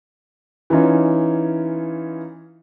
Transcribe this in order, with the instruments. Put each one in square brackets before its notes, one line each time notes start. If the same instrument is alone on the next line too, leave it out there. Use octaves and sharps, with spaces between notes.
[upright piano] E3 C#4 D#4 F4